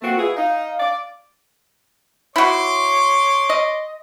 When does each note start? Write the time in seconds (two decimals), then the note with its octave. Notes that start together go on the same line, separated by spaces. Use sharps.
0.02 A3 A#3 C4 F#4
0.17 B3 E4 F4 G#4
0.37 D#4 F5
0.80 D5
2.36 E4 F#4 C#5 C6 D6
3.49 D#5